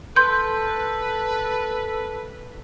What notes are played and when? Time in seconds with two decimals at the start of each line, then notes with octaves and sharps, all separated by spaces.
0.16 A4 B4 C6 G6